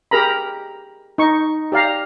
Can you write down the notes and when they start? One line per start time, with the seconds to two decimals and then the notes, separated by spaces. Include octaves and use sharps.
0.11 G4 G#4 A#4 A#5 B5
1.18 D#4 C#6
1.72 G4 D5 F5 A#5